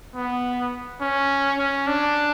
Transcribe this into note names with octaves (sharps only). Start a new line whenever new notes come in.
B3
C#4
C#4
D4